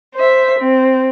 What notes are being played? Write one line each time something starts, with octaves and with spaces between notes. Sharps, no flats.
C5 E5
C4